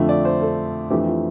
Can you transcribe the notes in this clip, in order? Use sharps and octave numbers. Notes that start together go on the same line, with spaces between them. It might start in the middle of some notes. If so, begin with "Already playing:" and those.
Already playing: F2 D3 F3 A3
D5
C5
A4
F2 E3 A3 D4 G4
F4